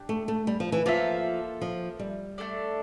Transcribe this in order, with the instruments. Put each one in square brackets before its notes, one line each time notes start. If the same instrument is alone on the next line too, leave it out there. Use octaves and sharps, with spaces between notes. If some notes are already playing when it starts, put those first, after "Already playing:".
Already playing: [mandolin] D4 G4
[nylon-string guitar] A3
A3
G3
F3
E3
[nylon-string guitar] F3 [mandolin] A#3 F4 A4 E5
[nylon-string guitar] F3
G3
[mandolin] A3 D4 A4 D5